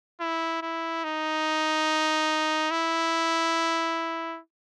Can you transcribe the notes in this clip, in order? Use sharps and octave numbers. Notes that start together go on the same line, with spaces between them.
E4
E4
D#4
E4